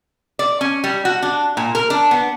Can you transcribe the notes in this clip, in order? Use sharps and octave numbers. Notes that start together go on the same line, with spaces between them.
D5
C#4
G3
F#4
D4
A#2
A#4
D4
B3